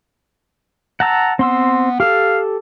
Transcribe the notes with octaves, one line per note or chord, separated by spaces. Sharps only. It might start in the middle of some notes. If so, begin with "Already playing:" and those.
F#5 A5 A#5 E6
B3 C4 C6 E6
G4 A4 F5